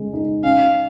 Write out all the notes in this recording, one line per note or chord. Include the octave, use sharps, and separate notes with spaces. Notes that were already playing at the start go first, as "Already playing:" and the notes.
Already playing: C#3 G#3
D#4
C#4 F5